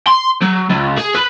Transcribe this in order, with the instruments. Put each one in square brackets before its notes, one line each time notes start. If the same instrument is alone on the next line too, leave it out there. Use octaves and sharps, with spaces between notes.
[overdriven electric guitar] C6
F#3
C#2
G#4
B4